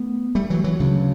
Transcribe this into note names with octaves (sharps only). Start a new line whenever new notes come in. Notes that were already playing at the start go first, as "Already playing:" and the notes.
Already playing: A3 B3
G3 A3
E3 F#3
E3 F#3
D2 C#3